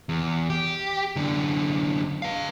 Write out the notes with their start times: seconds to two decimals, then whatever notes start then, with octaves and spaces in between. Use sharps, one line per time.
0.09 E2
0.50 G4
1.16 F#2 D3
2.22 B4 F5